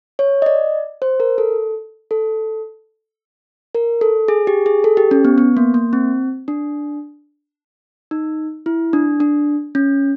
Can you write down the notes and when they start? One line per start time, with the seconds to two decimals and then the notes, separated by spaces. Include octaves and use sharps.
0.19 C#5
0.42 D#5
0.46 D5
1.02 C5
1.20 A#4
1.38 A4
2.11 A4
3.75 A#4
4.01 A4
4.28 G#4
4.47 G4
4.66 G#4
4.84 A4
4.97 G4
5.11 C#4
5.25 B3
5.38 B3
5.57 A#3
5.74 A#3
5.93 C4
6.48 D4
8.11 D#4
8.66 E4
8.93 D4
9.20 D4
9.75 C#4